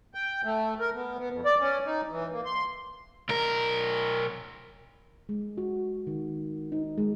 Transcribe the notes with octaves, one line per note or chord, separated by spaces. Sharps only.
G5
A3
A#4
B3
B3
F2
D5
C#4
D#4
E3
A#3
C6
B1 A#4
G#3
F#4
D#3
D#4
G#3